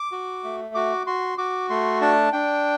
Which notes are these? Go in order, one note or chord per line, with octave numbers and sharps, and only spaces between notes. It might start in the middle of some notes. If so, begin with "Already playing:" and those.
Already playing: D6
F#4
A3
F#4 D6
F#4 C6
F#4 D6
A3 C6
D4 A5
D4 G5